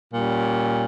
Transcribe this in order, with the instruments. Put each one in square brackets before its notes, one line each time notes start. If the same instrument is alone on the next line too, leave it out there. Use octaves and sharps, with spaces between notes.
[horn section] A#2 G3 C#4